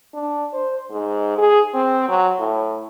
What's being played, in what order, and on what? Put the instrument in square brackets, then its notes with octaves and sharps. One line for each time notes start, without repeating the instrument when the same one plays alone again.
[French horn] D4
C5
G#2
G#4
C4
F#3
A2